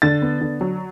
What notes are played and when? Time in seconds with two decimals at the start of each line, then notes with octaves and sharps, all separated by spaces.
0.02 D3 A6
0.22 B3
0.41 D3
0.61 F#3